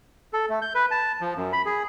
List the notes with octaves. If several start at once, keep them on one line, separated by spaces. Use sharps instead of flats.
A4
A3
G6
B4
A5
F3
F#2
B5
G#4